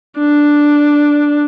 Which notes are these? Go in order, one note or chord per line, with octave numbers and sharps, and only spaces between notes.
D4